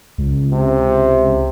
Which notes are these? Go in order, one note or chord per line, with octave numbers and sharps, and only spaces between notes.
C#2
C3